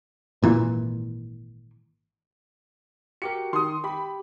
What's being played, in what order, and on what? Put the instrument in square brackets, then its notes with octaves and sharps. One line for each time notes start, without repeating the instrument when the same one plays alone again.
[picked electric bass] G#1 A#2 E3
[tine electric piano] F#4 G4 A#4 [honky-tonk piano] C#7
[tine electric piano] D#3 [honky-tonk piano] C6 D#6
[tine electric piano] G4 [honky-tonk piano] B5